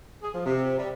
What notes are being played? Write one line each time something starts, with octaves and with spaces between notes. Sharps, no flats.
G#4
F3
C3
G3